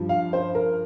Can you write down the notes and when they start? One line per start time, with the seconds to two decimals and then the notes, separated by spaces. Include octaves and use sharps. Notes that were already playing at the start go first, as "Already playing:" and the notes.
Already playing: G2 F3
0.09 F5
0.33 C5
0.55 A#4